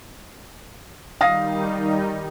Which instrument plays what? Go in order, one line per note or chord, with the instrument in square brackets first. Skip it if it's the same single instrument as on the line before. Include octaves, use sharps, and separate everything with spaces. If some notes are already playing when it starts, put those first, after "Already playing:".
[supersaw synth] D#3 G3 D#4 [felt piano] F5 D#6 A#6